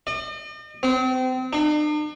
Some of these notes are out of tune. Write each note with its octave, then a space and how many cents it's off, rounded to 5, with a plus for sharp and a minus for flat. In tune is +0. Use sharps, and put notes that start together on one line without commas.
D#5 -45
C4 -30
D4 +45